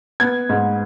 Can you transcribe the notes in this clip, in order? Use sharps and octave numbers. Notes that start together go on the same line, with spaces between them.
B3 G#6
G#2